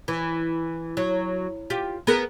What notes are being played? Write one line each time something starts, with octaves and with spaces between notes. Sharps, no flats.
E3
F#3
F4 G4
B3 G#4 A#4